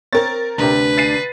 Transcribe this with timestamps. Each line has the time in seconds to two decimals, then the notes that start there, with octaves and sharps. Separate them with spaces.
0.13 C4 A#4 C#5 A6
0.58 D2 C3 D4 B4 A#5
0.97 A6 C7 D#7